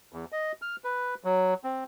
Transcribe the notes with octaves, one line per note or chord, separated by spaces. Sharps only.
E2
D#5
F6
B4
F#3
C4